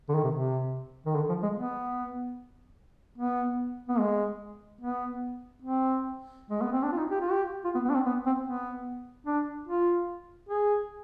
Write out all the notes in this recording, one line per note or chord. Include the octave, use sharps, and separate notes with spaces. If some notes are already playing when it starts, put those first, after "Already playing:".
D3
D#3
C3
C3
D#3
D3
F3
G#3
B3
B3
B3
G#3
B3
C4
G#3
B3
C4
D4
F4
D#4
G4
F4
G4
F4
B3
B3
D4
C4
B3
C4
B3
D4
F4
G#4